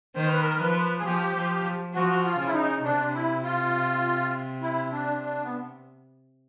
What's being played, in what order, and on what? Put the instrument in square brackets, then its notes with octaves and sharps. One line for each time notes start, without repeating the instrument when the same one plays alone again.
[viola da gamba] D#3 [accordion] C5
[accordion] B4
A#4
B4
[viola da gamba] F3
[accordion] G#4
[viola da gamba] F3 [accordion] G4
[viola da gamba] F3
[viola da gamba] F3 [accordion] F#4
[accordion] F4
[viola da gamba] C#3
[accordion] E4
D#4
[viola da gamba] C3 [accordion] D4
[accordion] E4
F4
E4
D4
D4
B3